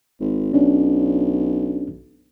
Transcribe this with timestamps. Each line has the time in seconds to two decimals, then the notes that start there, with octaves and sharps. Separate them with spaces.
0.20 G#1
0.53 B1 C#4 D4